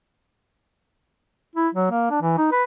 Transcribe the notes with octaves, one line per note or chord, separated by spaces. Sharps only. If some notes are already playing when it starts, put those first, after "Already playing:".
E4
F#3
A#3
D4
E3
D#4
B4